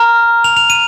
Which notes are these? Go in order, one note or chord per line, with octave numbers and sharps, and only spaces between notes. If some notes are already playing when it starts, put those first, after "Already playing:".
Already playing: A#5 F6
F7
F7
D#7